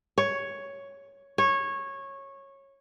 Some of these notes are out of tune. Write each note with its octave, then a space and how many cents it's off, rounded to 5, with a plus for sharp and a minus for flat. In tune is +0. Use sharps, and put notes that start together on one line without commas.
C#5 +5
C#5 -15